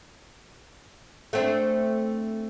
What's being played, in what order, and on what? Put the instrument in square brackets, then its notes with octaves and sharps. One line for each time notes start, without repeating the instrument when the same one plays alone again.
[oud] A3 C4 D4